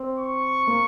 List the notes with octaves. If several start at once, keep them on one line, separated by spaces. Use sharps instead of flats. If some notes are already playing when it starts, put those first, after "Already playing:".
Already playing: C4
C#6
A#3